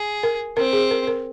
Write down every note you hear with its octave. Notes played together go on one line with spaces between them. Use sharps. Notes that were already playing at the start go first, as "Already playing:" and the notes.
Already playing: G#4
A#4
C4 A#4
G#4
A#4
A#4